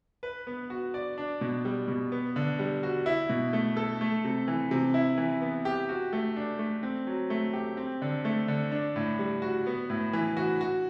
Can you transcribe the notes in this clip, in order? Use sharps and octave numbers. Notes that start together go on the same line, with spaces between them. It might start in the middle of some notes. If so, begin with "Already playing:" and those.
B4
B3
F#4
D5
D4
B2
G3
B2
B3
D3
G3
F#4
E4
B2
A3
A4
A3
C3
E3
C3
E4
E3
B3
G4
F#4
A3
D4
A3
C4
F#3
A3
G4
C4
D3
A3
D3
D4
A2
G3
F#4
B3
A2
E3
F#4
F#4